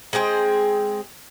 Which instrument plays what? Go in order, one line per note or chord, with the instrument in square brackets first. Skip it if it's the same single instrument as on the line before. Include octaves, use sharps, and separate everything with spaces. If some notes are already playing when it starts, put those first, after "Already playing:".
[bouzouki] G#3 C4 G#4 G5